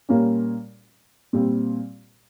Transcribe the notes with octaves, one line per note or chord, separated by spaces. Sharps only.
A#2 G3 A#3 C#4
A#2 G3 C4